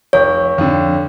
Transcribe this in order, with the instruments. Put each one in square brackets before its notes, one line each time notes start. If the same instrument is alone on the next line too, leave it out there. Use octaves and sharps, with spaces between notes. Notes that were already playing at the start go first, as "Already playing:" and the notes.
[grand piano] F1 [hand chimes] C#5
[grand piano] F2 D3